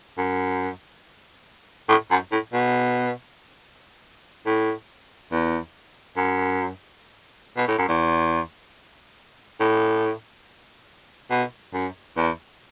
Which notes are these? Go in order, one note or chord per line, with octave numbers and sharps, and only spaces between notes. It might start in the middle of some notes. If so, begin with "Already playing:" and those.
F#2
A2
F#2
A2
B2
A2
E2
F#2
B2
A2
F#2
E2
A2
B2
F#2
E2